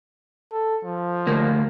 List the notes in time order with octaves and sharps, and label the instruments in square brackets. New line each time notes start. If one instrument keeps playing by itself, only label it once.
[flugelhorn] A4
F3
[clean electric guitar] D2 A#3